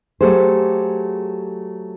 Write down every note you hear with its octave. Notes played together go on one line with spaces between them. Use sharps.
F#3 A3 G4 G#4 C5